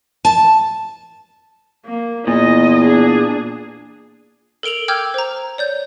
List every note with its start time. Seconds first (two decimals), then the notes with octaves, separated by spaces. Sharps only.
0.25 A5
1.85 A#3
2.27 E2 A#2 D#5
2.84 D4 G#4
4.63 A4 A#4 D7 F7 F#7
4.88 G5 D6 E6 F6 G6 G#6
5.14 C5 A#5
5.58 C#5 D5 G6